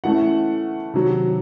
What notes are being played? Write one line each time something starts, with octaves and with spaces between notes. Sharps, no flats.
E3 A3 C#4 F#5
C3 D#3 F#3